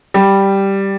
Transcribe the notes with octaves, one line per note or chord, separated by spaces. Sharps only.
G3